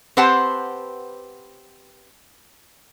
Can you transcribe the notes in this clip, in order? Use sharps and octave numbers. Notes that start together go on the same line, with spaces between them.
C4 G4 B4 C5 F#5 A5